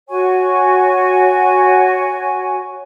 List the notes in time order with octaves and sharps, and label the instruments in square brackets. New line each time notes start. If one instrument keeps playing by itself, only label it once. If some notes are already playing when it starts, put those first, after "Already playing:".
[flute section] F#4 C#5 G#5 C#6